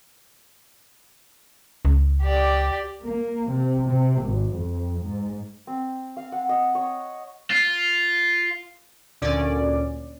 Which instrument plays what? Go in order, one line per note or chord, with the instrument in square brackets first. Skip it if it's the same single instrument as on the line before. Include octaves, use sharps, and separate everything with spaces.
[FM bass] C#2
[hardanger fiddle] G4 D5
[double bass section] A#3
C3
C3
G#1
F2
G#2
[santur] C4
F5
F#5
D#5
C#5
[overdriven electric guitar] F4
[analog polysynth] D2 A#2 D3 C#4 D5